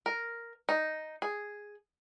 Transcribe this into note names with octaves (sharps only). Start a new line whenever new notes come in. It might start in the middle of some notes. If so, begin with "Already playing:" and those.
A#4
D#4
G#4